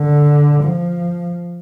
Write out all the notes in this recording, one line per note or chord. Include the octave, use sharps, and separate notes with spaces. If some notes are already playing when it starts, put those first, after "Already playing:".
Already playing: D3
F3